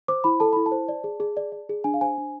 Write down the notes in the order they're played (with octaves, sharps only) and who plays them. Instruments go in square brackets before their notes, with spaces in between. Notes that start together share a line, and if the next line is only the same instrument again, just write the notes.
[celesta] C5 D6
E4 B5
A4 A5
E4 B5
A5
C5
D5
G#4
G#4
D5
D5
G#4
D4 G#5
F5
C5 G#5
D4